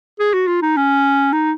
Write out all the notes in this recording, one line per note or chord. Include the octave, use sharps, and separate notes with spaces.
G#4
F#4
F4
D#4
C#4
D#4